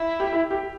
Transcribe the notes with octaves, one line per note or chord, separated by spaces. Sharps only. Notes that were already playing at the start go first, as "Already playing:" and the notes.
Already playing: E4
G4
E4
G4